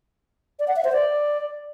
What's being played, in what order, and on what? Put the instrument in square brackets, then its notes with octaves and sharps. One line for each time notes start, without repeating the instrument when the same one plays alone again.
[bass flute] D5
F#5
E5
C5
D5